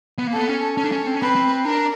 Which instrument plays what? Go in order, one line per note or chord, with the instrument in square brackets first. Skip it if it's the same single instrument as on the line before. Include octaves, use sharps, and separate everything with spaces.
[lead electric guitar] B3
A#3
[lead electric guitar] B3 [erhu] A4
[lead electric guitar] C#4
[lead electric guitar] C#4 [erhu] A4
[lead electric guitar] D4
C#4
C4
C#4
[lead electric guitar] C4 [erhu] B4
[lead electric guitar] C4
[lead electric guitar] D4 [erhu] A#4